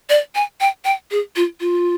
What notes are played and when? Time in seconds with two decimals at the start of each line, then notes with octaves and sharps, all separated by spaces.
0.10 D5
0.35 G#5
0.61 G5
0.85 G5
1.11 G#4
1.36 F4
1.60 F4